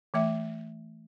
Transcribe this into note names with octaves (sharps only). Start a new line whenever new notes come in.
E3 A3 E5